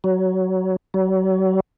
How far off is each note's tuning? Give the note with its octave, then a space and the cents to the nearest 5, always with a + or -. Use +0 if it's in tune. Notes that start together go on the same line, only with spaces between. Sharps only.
F#3 +15
F#3 +35